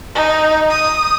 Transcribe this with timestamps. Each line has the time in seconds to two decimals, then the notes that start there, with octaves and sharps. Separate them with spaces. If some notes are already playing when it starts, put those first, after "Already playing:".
0.15 D#4
0.70 D#6